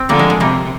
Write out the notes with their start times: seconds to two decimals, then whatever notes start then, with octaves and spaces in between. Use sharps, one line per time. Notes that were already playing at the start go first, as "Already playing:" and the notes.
Already playing: C4
0.09 D3 F3 G3 A#3
0.19 G#3
0.30 G#3
0.40 C3 G3 A#3